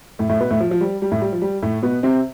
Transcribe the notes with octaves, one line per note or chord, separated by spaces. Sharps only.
A2 A3
A2 A3
B2 B3
A2 A3
F3
F3
G3
G3
A2 A3
G3
F3
G3
A2 A3
B2 B3
C3 C4